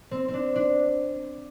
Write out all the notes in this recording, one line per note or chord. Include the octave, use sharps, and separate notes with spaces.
C4
C4
D4
D4